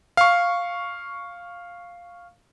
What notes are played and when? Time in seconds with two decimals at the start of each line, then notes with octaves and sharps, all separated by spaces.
0.17 F5 C#6